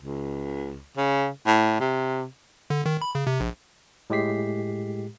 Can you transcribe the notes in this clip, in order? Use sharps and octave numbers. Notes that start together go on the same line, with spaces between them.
C#2
C#3
A2
C3
D3
D#3
B5
C#3
C3
A#1
A2 G#3 G4 B6 C7